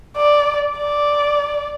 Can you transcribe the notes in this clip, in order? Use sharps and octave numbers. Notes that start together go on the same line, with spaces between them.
D5
D5